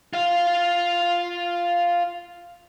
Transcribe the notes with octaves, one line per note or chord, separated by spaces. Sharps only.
F4 F5